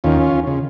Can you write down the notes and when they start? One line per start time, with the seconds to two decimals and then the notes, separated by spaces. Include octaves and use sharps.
0.04 D#2 D#3 C#4 F4
0.47 C#3